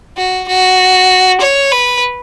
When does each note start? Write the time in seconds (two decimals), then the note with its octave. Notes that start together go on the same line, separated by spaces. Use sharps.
0.17 F#4
0.48 F#4
1.41 C#5
1.72 B4